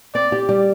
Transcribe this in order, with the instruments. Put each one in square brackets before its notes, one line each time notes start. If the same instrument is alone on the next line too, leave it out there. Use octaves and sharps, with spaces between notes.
[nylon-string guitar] C4 [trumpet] D5
[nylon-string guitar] G4
G3